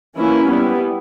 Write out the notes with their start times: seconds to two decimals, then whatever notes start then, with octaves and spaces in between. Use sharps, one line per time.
0.15 E3 A#3 C#4 E4
0.47 G3 B3 E4